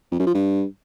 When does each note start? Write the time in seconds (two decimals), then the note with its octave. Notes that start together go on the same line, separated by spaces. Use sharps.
0.12 F2
0.19 F#2
0.27 F3
0.35 G2